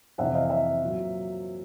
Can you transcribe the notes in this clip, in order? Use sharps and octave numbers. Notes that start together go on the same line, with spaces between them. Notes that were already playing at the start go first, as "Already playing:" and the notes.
F2 C3 E3 E5 F#5
D#5 F5
F5
E5
A#2 F#3